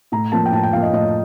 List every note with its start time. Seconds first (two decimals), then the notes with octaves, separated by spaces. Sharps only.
0.12 A2 A#5
0.32 F3 A#3 A5
0.45 G5
0.52 A2 A5
0.63 G5
0.73 F3 A#3 F5
0.82 D#5
0.93 A2 D#5